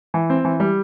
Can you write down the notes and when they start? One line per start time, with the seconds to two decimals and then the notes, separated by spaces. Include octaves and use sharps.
0.14 E3
0.30 C4
0.45 E3
0.60 G3